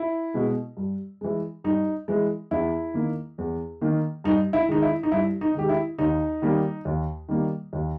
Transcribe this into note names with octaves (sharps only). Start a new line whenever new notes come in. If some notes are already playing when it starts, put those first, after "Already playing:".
Already playing: E4
B2 G#3
G2
E3 G#3
G2 D#4
E3 G#3
E2 E4
D#3 A#3
E2
D#3 A#3
G2 D#4
E4
D#3 G#3 D#4
E4
D#4
G2 E4
D#4
D#3 G#3 G4
E4
D#2 D#4
D#3 G3 A#3
D#2
D#3 G3 A#3
D#2